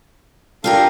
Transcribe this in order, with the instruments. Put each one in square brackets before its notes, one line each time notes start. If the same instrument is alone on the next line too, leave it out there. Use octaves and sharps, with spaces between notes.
[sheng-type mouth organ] D4 A4 F5 [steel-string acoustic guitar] F4 G4 A#4